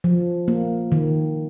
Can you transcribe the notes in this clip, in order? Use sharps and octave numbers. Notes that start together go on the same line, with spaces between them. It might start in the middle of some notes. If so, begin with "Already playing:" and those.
F3
A#3
D#3